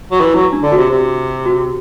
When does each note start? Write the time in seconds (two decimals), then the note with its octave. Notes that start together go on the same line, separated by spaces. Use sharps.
0.11 F#3
0.21 E3
0.34 F#3 E4
0.53 D4
0.62 D3
0.72 C3 F#4
0.91 C3
1.46 F#4